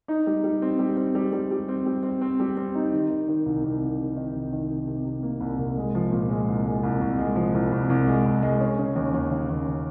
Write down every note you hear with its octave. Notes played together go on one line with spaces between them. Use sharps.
D#4
G3
G3
C4
G3
C4
G3
G3
G3
C4
G3
C4
C4
G3
C4
D#4
D#3
D#3
D#3
C2
C2
C3
C3
D#3
C2
D#3
C3
C3
C3
A#3
C2
C2
G#3
F3
A#2
G#3
C2
G#3
C2
C2
G#3
F3
C2
C2
C2
G#3
C2
G#3
C#4
C#3
D#2
D#2
C#3
D#2